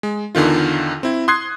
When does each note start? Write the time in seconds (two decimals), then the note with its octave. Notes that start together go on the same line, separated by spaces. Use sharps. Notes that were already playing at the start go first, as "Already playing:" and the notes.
0.03 G#3
0.35 E2 D3 D#3 F4
1.03 C4 E4
1.28 C6 D#6 F#6 G#6 C7